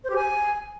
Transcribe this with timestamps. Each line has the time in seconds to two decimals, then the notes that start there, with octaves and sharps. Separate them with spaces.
0.04 C5
0.10 G4
0.16 G#5